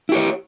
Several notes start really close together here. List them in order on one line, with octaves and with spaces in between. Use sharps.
E4 G4 C#5